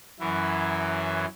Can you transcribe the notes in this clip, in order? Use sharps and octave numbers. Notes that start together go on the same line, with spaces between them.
F#2 E3 F#3 E4